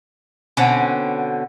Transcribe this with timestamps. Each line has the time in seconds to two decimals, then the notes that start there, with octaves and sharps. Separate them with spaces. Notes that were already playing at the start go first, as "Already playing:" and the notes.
0.57 B2 D3 C4 C#4